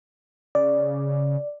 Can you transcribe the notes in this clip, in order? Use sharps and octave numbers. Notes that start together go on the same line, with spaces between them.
C#3 D5